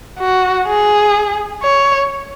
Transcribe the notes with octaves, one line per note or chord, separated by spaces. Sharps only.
F#4
G#4
C#5